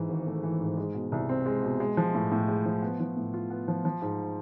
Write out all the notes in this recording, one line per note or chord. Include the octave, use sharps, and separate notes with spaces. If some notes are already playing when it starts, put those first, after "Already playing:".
Already playing: G#2 E3
G#1
A3
E3
G#2
G#3
B2
C2
C4
G#3
B2
G#3
F3
A2
A2
G#3
F3
B3
F3
A2
F4
B3
F3
F3
G#2